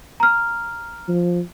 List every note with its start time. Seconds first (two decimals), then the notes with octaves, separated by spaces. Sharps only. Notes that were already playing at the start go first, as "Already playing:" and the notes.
0.20 A#5 F6
1.08 F3